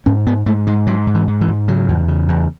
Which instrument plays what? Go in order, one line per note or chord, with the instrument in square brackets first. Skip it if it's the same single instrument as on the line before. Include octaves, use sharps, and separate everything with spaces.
[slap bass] G#2 C#4
G#2 B3
G#2 A3
G#2 G#3
G#2 F#3
G#2
E3
G#2
E3
G#2
C#3 F#3
E2
C#3
E2